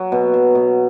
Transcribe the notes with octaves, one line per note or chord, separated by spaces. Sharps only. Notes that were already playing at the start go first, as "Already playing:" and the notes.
Already playing: F#3
B2
F#3
B2